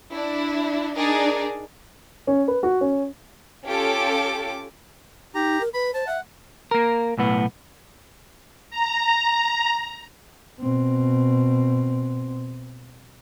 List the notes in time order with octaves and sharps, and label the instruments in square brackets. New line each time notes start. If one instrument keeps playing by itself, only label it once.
[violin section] D4 E4
D4 D#4 G#4 A#4 D5
[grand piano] C#4
B4
F#4
C#4
[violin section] C#4 F4 G4 A4 D6
[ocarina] D#4 [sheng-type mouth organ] G4 A#5
[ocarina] A#4
[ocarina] B4 [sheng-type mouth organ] B5
[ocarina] C5 [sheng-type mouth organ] A5
[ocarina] E5 [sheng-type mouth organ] F#5
[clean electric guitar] A#3 A#4
B1 A2 B3
[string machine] A#5
[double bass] B2 C4